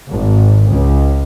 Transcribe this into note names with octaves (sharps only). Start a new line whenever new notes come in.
G#1
C#2